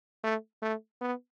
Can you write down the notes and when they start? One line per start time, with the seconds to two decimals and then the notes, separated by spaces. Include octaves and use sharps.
0.23 A3
0.62 A3
1.01 B3